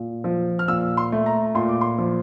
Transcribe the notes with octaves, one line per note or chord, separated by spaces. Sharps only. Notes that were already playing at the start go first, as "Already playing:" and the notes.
Already playing: A#2
F3
F6
A#2 E6
C6
A3
A#5
A#2 C6
D6
C6
F3